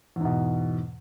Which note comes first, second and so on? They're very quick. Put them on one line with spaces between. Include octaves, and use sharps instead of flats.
E2 G#2 B2